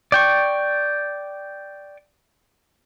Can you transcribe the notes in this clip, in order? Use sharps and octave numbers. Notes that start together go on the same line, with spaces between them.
D5 G5 C#6